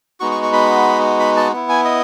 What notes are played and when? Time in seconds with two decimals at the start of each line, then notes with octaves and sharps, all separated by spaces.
0.20 G#3 B3 D#4 F#4 C#6
0.31 C#6
0.43 C#6
0.53 B5
1.19 B5
1.36 A5
1.52 B3 E4
1.69 G#5
1.85 D#5